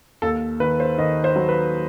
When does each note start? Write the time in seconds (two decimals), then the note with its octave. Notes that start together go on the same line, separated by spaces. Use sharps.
0.22 D#2 A4
0.60 D#3 B4
0.80 C5
0.98 D#3 D#5
1.24 C5
1.36 F#3
1.49 B4